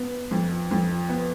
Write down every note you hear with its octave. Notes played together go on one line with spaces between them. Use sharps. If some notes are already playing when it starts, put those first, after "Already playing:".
Already playing: B3
F2
F2
B3